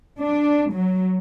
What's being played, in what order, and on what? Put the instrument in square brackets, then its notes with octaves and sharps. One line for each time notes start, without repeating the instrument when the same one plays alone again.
[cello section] D4
F#3